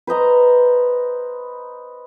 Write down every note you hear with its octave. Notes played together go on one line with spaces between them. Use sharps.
B4 C5 D#5 A#5